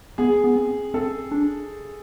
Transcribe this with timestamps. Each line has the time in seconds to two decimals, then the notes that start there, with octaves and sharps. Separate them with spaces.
0.18 B3 G#4
0.44 B3
0.56 C4
0.94 C4 A4
1.32 D4